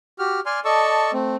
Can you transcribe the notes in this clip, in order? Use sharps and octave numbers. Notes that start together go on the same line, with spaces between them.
F#4 G4 F6
D5 G#5 C6 F6
A4 D5 D#5 A5 C#6 E6
A3 C4